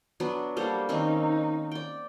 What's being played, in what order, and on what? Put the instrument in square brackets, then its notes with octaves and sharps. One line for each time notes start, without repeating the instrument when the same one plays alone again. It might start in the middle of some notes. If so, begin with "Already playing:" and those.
[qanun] F#3 B3 D4
[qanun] G3 A#3 C5 [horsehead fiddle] A4
[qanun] D#3 C4 C#4 [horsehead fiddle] D#4
[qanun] D5 G5